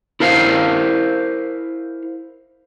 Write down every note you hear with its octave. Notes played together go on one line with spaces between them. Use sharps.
E4 A#4 C5 F5